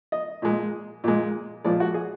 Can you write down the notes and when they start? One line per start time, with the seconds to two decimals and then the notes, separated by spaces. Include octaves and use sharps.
0.12 D#5
0.42 A#2 G#3
1.04 A#2 G#3
1.64 A#2 F3 G#3 D5
1.80 F#4
1.94 G#4